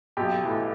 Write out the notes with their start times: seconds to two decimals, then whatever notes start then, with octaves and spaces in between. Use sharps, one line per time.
0.17 B1 G4
0.43 A2 E3